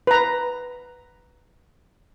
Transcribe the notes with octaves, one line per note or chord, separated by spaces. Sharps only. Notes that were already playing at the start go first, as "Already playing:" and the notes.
B4 A#5